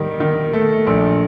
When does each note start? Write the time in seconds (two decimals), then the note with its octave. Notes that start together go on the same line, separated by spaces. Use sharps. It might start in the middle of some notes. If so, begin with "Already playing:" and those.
Already playing: D#3 G3
0.20 D#3
0.53 A3
0.87 A#1